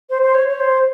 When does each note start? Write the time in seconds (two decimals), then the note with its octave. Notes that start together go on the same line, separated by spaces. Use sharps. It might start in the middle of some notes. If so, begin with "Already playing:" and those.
0.09 C5
0.22 C5
0.34 C#5
0.47 C#5
0.60 C5